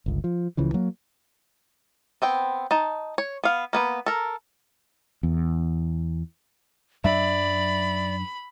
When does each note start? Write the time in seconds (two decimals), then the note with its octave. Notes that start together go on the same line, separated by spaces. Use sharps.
0.06 G1 C#2
0.24 F3
0.57 C#2 C#3 E3 F3
0.74 F#3 A#3
2.22 B3 C4 G5
2.71 D#4 A5
3.18 C#5
3.44 B3 F5
3.73 A#3 B3 B4
4.06 A4 A#4
5.23 E2
7.04 F#2 F#3 D4 D5 E5 B5